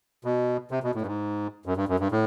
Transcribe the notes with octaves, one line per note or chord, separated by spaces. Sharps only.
B2
C3
B2
A2
G2
G#2
F#2
G2
F#2
G2
A2